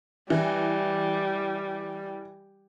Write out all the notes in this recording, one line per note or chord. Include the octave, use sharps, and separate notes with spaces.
E3 G3